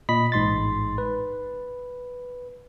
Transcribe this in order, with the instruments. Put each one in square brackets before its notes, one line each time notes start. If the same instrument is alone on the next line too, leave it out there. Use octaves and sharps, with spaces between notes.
[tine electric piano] A#2 D#5 B5 B6
A1 G#2 C6 A6
B4